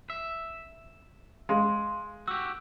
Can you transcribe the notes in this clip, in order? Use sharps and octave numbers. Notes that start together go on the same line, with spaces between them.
E5
G#3 F5 C6
F#4 G4 E6